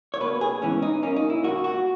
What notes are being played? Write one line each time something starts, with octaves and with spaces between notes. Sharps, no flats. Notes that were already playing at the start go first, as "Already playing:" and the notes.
C#5
B2 A#3 B4
G#4
G#2 E3 B3 C#4
D#4
B2 A#3 C#4
D#4
E4
A#2 A#3 F#4
F#4